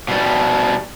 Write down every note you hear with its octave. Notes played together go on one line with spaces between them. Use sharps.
B2 G3